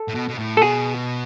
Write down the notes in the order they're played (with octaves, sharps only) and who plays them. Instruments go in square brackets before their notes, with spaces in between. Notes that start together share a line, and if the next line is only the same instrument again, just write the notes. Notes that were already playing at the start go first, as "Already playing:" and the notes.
Already playing: [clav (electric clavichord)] A4
[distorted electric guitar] A2
B2
B2
A2
[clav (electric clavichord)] A4
[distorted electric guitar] B2 [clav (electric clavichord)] G#4